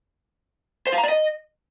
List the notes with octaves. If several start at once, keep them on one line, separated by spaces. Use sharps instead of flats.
C5
F5
A#5
D5
D#5